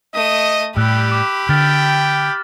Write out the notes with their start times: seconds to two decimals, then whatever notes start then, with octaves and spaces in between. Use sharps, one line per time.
0.14 A3 D#5 D#6
0.77 A2 G3 G4 B5 E6 F#6
1.12 D6
1.49 D3 G5 F6 A6